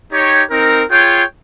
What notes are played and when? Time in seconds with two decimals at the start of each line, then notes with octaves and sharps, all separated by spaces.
0.11 D#4 G4 C#5 G5
0.51 C4 D#4 A#4
0.91 F4 G#4 C#5 G5